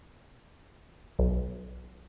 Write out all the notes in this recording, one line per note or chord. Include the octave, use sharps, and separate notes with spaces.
B1